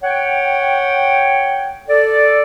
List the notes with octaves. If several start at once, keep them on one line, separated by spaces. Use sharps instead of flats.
C#5 F#5 G5
A4 D5